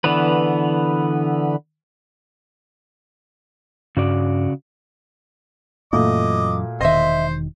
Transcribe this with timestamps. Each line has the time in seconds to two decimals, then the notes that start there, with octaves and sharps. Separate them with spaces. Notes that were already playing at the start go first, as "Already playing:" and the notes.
0.04 D3 E3 B3 B4
3.97 G2 C#3 F#4 D5
5.93 F#2 A#2 E3 F#3 A3 F#4 D#5 D6
6.81 E1 D#3 C5 D#5 E5